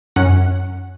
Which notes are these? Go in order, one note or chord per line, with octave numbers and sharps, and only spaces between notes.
F#2 C#4 F#5